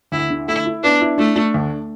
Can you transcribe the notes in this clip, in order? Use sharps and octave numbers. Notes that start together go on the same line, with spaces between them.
D2 E4
D3
A3 E4
E4
B3 D4
E4
A3 D4
D4
D2